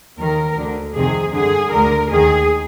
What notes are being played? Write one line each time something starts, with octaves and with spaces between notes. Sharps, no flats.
D#2 D#3 A#4
D2 D3
F2 C3 D#3 G#4
G2 D3 G#4
D2 D3 A#4
D#2 D#3 G#4